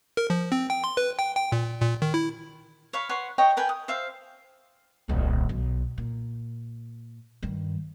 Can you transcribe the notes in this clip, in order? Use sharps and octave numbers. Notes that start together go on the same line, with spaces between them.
A#4
F3
C4
G5
C6
B4
G5
G5
A#2
A#2
D#3
E4
C#5 F5 B5
B4 C#5 F#5 C6
C#5 D#5 G5
A#4 B4 G5 G#5
D#6
C5 E5 F5
D#1 C2
B1
A#2
G2 D#3